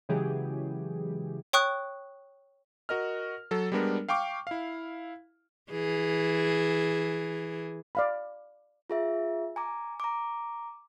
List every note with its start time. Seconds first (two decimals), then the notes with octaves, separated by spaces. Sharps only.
0.09 C#3 E3 F#3 G#3 G4 G#4
1.53 C#5 G5 C#6 D#6 F#6
2.89 F#4 A#4 D#5 F6
3.51 F#3 A4
3.72 G3 G#3 B3 D4 A#4
4.09 F5 G5 C#6 D6
4.47 E4 F5
5.71 E3 G#4
7.95 D5 F5 B5
8.90 F4 G#4 E5
9.56 G#5 A#5 D6
10.00 A#5 D6